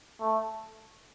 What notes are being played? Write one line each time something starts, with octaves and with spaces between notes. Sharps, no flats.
A3